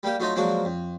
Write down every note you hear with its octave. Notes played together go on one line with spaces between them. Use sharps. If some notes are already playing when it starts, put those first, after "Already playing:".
G3 A#3 G4
F#3 A3 D#4 F4 D#5 E5
F3 F#3 G#3 A#3 D4 F#4
F2